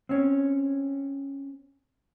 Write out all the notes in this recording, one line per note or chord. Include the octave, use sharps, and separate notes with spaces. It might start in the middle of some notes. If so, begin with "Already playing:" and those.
C4 C#4